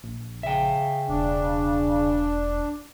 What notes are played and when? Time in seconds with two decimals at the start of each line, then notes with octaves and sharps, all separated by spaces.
0.03 A#1
0.43 C#3 E5 G5
1.09 E1 D4